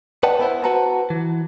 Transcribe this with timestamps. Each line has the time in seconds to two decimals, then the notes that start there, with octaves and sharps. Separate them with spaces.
0.23 B4 D5 D#5 F#5 G5 A5
0.39 B3 E4 C5
0.64 F#4 B4 F#5 A5 A#5
1.10 E3